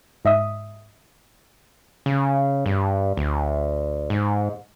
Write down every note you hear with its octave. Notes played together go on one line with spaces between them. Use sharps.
G#2 D#5 E5 D#6
C#3
G2
D2
G#2